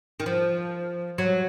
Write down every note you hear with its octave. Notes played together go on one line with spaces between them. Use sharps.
D#3
F3
F#3